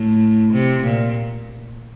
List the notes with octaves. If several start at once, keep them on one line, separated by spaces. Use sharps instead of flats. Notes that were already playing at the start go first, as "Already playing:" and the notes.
Already playing: A2
C3
A#2